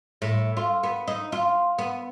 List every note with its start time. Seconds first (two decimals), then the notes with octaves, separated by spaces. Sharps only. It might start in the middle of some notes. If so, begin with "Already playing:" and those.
0.22 A2
0.57 F4
0.83 B3
1.08 D#4
1.32 F4
1.78 B3